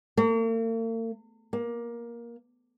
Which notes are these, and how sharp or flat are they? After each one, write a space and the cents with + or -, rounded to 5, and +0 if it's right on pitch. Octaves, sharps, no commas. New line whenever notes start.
A#3 -45
A#3 +15